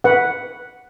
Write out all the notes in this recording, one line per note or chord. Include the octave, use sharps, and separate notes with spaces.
B4 F#5